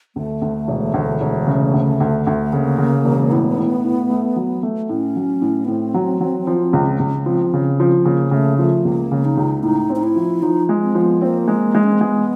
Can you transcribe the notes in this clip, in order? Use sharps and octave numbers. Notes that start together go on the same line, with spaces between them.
D2 A3
D2
E1
D2
E1
C#3
D2
D2
D2
C#3 A#3
C#3
E1
A2 B3
A2
A2
A3
F#3
A3
A2 C#4
F#3
A2
B3
A2 C4
F#3
F#3
F3
C#2
C#2
F3 C4
C#3
F3
C#3 A#3
C#3 A3
F3 A3
C#2 A#3
C#3
D#4
C#2
A2 D#4
C4
D#4
E4
F3
F3 D#4
G#3
C4
F3
B3
A#3 C4
G#3
G#3
C#4
C4
G#3 B3